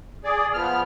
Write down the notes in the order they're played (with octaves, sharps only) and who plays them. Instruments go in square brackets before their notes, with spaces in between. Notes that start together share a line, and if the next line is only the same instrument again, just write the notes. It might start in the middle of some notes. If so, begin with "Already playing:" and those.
[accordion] G#4 D5
F3 B3 F6